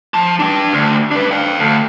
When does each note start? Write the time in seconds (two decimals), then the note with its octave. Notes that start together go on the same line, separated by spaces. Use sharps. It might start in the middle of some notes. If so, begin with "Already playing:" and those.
0.14 F3 A5
0.40 D4 G5
0.72 D2
1.11 D4 B4
1.31 F5 G5
1.59 D2